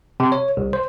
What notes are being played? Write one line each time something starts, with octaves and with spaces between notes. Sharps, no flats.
C3
C#5
C2
C5